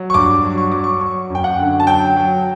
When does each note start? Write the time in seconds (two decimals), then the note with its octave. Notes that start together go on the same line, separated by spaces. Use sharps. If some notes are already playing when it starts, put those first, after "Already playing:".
Already playing: F#3
0.10 C#6
0.14 G2 D6
0.43 F#3
0.58 C#6
0.72 F#3 D6
0.84 C#6
1.01 F#3 C#6
1.30 F#2 G5
1.44 F#5
1.59 D3
1.80 A5
1.87 F#3 G5
2.16 F#3